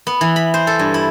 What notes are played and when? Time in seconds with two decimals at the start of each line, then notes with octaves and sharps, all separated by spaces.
0.07 B3
0.21 E3
0.36 B5
0.54 C5
0.67 A4
0.79 G2
0.94 E4